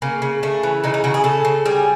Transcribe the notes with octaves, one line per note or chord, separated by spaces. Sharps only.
C#3 A#3
C#3
C#3 A3
E3
C#3 D#4
D#4
C#3 F#4
G#4
C#3 A4
C#3
G3 G#4